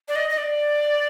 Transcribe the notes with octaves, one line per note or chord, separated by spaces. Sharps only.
D5
D#5
D#5
D5